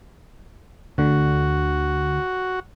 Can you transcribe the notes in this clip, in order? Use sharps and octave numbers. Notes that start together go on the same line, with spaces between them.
D2 D3 F#4